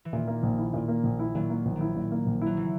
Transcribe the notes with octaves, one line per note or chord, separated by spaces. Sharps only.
E3
A#2 D#3
A#3
A#1
E4
A#2
A#3
A#1
E4
A#2 D#3 F#3
A#3
A#1
D#3
E4
A#2
A#3
A#1
F#3 E4
C#3 E3